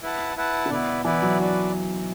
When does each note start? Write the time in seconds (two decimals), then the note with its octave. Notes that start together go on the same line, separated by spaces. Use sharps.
0.03 E4 B4 F#5 A5
0.36 E4 B4 F#5 A5
0.66 D3
0.70 B2 B3 E4 B4 D5
1.05 E3 B3 E4 B4 D5
1.22 F#3
1.39 D4 F#4 B4 D5